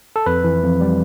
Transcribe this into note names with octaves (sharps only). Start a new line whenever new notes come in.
A4
F2 B4
E3
F2
G3